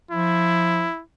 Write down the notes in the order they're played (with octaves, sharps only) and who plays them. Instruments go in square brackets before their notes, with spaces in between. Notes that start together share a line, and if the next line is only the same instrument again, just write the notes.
[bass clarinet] F3 [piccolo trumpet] E4